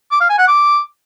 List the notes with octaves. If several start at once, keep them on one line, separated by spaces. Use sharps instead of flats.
D6
F5
G#5
F#5
D6